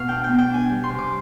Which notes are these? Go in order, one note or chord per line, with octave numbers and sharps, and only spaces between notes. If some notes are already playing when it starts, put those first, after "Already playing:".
Already playing: B2 F5
D4 G5
B3 G5
G5
D4 G#5
G3
C6
C3
D6